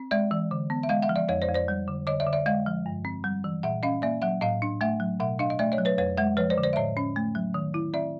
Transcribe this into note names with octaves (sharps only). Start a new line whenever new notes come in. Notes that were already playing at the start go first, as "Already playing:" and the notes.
Already playing: C4
G#3 D5 E5
E3
D3
B3
E5
G#3 D#5 F5
E5 F#5
F3
D5 E5
F2 C#5 D#5
C5 D5
F2
C5 D5
G3
D3
D3 C#5 D#5
D5 E5
D3
D5 E5
G#3 D#5 F5
F3
G2
C4
G3
E3
A#2 E5 F#5
C#4 D#5 F5
A#3 D5 E5
F#3 E5 F#5
A2 D#5 F5
D4
A3 E5 F#5
F#3
B2 E5 F#5
D4 D#5 F5
D#5
A3 D5 E5
C#5 D#5
F#3
B4 C#5
F2 B4 C#5
G#3 E5 F#5
F3 B4 C#5
C5 D5
D3
C5 D5
E5
A2 C#5 D#5
C#4
A3
F#3
D#3
E4
C4 D5 E5